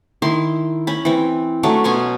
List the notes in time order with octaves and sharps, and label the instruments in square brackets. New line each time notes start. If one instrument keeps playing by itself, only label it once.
[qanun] D#3 E4 C6
C#4 B5
E3 C4
F#3 A3 C#4 D4
B2 C#4 G#5 C6